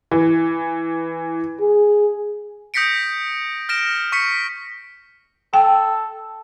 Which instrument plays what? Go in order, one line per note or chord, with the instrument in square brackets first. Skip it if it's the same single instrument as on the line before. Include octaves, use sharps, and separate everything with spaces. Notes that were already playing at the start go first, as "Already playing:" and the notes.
[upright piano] E3
[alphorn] G#4
[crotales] D#6 G6 A#6 B6 C#7 D7
F6 A#6 D7 E7
C#6 B6 C#7
[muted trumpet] A4 [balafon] G5